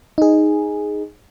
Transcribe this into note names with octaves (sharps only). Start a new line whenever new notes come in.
D#4 G#4